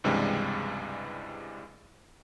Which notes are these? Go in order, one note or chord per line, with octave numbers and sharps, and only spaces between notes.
C#2 G2 C3 E3 G3 G#3